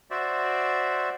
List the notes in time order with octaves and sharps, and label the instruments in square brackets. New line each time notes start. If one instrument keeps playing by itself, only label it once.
[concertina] F#4 C5 D5 E5